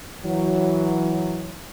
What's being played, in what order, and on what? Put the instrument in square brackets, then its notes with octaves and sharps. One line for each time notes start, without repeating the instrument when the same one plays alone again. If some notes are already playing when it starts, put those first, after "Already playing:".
[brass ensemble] E3 F#3